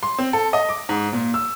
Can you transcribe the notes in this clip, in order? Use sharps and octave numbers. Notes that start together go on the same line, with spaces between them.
C6
C4
A4
D#5
D6
G#2
A#2
E6